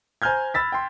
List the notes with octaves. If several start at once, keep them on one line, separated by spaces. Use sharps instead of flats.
C5 G#5 A#5 F6 G6 G#6
B5 E6 A6 B6
G5 C6